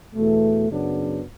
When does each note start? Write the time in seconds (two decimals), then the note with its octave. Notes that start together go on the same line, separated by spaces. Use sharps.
0.15 E2 B2 A3
0.69 F#2 C#3 F#3 B3 D4